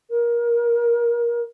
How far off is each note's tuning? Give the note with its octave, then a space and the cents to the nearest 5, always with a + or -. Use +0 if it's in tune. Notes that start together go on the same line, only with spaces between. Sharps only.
A#4 +20